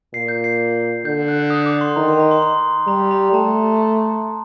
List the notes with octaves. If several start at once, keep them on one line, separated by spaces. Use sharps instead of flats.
A#2 C7
G6
C7
D3 G6
F#6
D#6
D6
C6
D#3 A#5
C6
A#5
C6
C6
G3 A#5
A#5
A3 A5